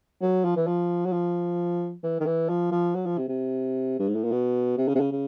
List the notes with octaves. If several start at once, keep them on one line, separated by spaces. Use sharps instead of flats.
F#3
F3
E3
F3
F#3
F3
E3
D#3
E3
F3
F3
F#3
F3
C3
C3
G2
G#2
A2
A#2
B2
C3
C#3
C3
C#3
C#3